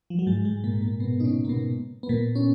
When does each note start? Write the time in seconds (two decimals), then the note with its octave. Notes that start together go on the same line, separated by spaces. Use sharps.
0.10 F3
0.19 F#3
0.27 G#2 G#3
0.45 G#2 G#3
0.64 A#2 A#3
0.81 A#2 A#3
1.00 B2 B3
1.20 D#4
1.24 C#3 C#4
1.44 A#3
1.49 B2 B3
2.03 B3
2.09 A#2 A#3
2.35 C#4